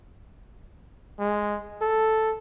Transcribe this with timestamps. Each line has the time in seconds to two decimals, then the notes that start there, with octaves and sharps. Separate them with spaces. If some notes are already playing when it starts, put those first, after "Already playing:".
1.19 G#3
1.81 A4